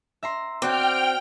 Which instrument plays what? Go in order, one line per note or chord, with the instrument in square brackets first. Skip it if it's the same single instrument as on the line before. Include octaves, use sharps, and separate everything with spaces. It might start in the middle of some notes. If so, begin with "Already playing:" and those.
[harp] E5 A#5 C6
[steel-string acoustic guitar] C4 [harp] F#4 C5 D5 [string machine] G5 F6